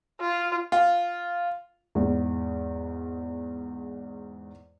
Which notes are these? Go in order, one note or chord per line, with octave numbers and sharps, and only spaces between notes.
F4
F4
E2 G#2